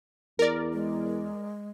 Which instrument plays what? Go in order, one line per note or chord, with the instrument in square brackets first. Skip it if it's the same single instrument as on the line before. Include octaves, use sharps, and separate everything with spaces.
[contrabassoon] E2 [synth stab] A#4 D5
[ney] G#3